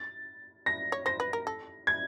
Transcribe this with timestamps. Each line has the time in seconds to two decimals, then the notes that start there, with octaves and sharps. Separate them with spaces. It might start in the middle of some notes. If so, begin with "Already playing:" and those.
Already playing: A6
0.66 A#6
0.92 C#5
1.06 C5 A#6
1.20 B4
1.33 A#4
1.47 A4
1.87 G#6